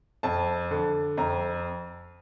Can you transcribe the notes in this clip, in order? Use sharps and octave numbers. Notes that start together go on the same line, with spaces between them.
F2 A5
D3
F2 A#5